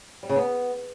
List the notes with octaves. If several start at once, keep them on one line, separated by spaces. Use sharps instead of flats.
G3
C#3
B3